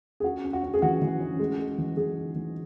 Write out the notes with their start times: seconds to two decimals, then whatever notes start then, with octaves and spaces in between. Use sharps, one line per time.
0.20 G#4
0.24 C#4 F#4
0.44 C#4
0.53 F#4
0.63 C#4
0.74 G#4
0.82 E3 F#4
1.02 E3
1.20 C#4
1.39 G#3
1.59 G#3
1.78 E3
1.97 E3 G#4
2.17 D#4
2.36 E3